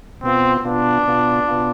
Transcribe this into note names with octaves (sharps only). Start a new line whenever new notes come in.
B2 B3 C4 F4
B2 B3 D4 F4
B2 B3 F4
B2 B3 F4